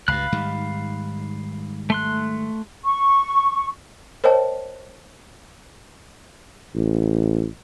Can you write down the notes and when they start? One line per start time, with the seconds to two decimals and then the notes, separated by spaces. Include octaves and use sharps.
0.08 C#2 G2 F5 B5 F#6
0.32 G#2 D#3 G3
1.90 A3 C6 F#6
2.84 C#6
4.24 A#4 C5 C#5 D#5 G5 A5
6.75 A1